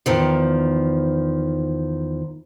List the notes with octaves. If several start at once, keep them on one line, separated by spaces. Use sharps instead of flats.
E2 D#3 F3